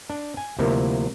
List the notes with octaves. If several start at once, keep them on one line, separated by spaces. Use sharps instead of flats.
D4
G#5
D2 C3 F3 A#3 E4